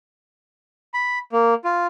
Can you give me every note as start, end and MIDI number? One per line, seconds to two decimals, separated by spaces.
0.94 1.19 83
1.32 1.54 58
1.64 1.87 65